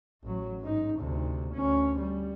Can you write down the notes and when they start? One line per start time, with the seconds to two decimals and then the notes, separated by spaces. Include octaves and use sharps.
0.23 A1 F#3
0.61 G#2 D#4
0.99 D2 C3
1.54 D2 C#4
1.99 G3